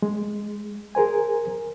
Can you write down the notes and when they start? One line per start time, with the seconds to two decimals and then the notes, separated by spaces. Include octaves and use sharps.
0.02 G#3
0.95 G#4 A#4 C5 G#5